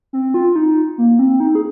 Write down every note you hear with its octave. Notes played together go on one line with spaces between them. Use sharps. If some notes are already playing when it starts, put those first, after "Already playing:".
C4
F4
D#4
A#3
C4
D#4
G#4